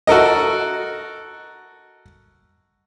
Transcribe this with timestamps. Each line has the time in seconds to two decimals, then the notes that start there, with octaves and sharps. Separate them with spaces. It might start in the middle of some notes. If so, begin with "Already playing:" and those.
0.07 F#4 A4 A#4 D#5